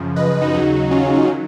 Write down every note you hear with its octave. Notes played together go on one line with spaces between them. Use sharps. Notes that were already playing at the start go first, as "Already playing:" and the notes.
Already playing: F#2 C#3 F3
B4 D#5
D#4 F#4
D#2 C#3 F#3 D#4 F#4
C#4 F4
D#4
D#4
D#3 F#3